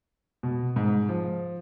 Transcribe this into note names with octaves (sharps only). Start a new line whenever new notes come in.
B2
G#2
F3